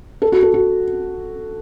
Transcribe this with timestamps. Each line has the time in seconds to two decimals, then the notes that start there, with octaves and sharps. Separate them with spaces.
0.22 A4
0.32 F#4
0.43 A4
0.54 F#4